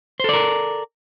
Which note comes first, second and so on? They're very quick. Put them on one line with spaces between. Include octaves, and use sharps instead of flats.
C5 A4 D5 A#4